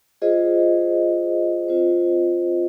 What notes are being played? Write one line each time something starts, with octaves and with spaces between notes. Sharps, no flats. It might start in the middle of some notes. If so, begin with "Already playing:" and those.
F4 G#4 C5 D#5
C4 F4 C5 D#5